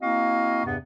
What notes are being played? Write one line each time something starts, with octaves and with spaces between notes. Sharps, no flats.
A#3 C4 E4 F#4 D#5 F5
E2 G2 C3 B3